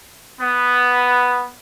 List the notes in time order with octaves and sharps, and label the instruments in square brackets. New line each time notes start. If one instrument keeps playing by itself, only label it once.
[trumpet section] B3